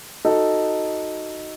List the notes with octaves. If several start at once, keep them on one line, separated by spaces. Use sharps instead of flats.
D#4 F#4 A4 D#5